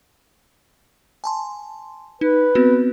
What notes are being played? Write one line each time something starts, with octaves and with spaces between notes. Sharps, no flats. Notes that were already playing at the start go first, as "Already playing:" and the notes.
G#5 A5 C6
D#4 B4
B3 C4 F#4